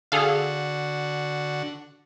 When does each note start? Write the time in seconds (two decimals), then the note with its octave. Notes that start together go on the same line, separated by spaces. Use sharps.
0.12 D3 F#4 G#4 A4 F5